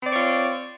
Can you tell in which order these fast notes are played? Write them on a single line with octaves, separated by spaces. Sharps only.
C4 D5 C#5 F4